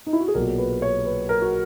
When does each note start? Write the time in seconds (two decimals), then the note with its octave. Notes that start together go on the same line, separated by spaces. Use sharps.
0.07 D#4
0.13 E4
0.20 F#4
0.28 G#4
0.34 B1 A#2 F#3 A#4
0.58 B4
0.82 C#5
1.05 B4
1.29 A#4
1.42 F#4